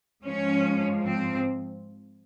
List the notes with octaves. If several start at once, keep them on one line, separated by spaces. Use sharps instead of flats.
G#2 F3 C#4
C4